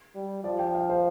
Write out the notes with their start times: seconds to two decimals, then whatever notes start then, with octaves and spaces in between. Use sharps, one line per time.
0.15 G3
0.44 F3 D5
0.59 G5
0.74 F5
0.89 C5